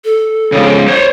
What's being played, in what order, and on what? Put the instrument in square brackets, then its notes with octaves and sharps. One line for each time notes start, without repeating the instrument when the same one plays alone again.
[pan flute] A4
[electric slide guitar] C#3 F3 G#3
C5 C#5